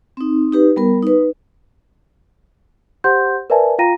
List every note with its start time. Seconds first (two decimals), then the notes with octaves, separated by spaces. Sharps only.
0.17 C4 D#4
0.53 D#4 G4 B4
0.76 G3 B3 A#4
1.02 D#4 B4
3.04 G4 C5 F#5 C6 G6
3.50 A#4 B4 D5 E5 G#5 A5
3.78 F4 F5 G5 A#5 A#6 D#7